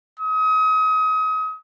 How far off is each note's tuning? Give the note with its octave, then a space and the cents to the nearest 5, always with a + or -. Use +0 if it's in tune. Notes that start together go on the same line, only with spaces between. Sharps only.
D#6 +35